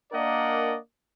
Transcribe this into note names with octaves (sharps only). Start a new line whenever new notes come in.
A#3 D4 A#4 D5 D#5 F#5